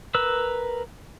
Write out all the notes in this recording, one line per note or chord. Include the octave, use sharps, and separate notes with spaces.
A#4 B4 E6